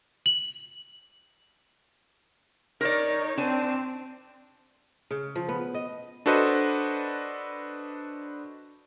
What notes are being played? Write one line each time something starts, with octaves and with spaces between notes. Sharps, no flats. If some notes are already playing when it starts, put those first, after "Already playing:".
F#7
D#4 A#4 C#5 D5
C4 D4 G#5
C#3
F3
B3
D#5
D4 F#4 A4 B4 C5 D#5